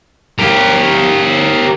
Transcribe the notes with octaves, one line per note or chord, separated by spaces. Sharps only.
G4 A#4